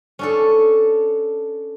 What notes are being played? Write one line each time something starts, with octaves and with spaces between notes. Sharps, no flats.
C#4 D4 A4